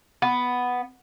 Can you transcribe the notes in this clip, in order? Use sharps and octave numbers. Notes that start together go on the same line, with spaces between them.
B3